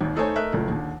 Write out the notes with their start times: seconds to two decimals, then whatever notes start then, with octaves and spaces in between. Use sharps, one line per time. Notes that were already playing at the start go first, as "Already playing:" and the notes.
0.01 G#1 D#2
0.16 A3 D#4 A4 C5 C#5 G#5
0.35 A3 A#4 D#5 E5 F#6
0.52 F#1 C#2 A3
0.68 D#2 D3